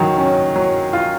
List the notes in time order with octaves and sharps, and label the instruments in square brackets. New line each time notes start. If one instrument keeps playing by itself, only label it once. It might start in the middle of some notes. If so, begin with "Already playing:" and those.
Already playing: [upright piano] D#3 [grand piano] F#3
[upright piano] C#4
F#3
F4